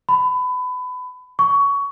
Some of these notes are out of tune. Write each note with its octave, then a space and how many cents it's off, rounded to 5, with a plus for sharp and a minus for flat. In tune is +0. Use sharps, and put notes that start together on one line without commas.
B5 +25
C#6 +20